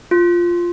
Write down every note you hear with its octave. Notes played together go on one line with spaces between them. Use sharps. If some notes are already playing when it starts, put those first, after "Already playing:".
F4